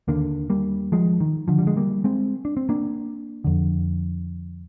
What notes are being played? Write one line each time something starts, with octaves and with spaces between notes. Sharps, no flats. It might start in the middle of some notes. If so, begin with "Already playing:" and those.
D#2 D3 A#3 D4
G3 A#3
F3 G#3
D#3
D3 F3
G3
G#3
G3 A#3
G#3 C4
D4
C4
A#3 D4
F2 D3